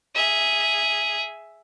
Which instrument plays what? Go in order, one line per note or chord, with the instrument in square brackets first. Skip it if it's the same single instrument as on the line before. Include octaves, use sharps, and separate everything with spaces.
[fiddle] G#4 E5